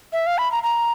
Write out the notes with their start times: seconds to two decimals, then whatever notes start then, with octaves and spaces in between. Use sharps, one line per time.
0.13 E5
0.27 F5
0.38 B5
0.52 A#5
0.63 A#5